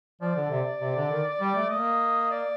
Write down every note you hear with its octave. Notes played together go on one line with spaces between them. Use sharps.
F3 D5
D3
C3
C3
D3
D#3
G3
A3
A#3 D#5
D5